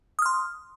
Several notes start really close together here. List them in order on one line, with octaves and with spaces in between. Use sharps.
D#6 F6 C6